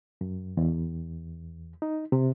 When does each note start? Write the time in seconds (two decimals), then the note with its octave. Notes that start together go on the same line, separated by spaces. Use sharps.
0.21 F#2
0.57 E2
1.82 D#4
2.12 C3